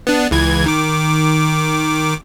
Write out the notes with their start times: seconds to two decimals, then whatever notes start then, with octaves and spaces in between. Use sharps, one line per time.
0.07 B3 D4
0.31 C#2 E3 G#6
0.66 D#3 D6